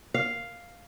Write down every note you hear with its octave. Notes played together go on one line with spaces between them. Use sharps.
F5